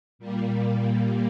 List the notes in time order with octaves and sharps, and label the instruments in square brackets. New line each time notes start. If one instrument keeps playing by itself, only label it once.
[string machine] A#2 G3 A#3